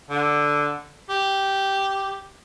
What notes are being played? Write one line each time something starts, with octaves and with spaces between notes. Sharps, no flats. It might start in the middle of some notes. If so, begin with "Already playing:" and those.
D3
G4